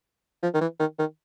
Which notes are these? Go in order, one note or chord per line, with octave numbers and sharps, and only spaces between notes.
F3
D#3
E3
D#3
D#3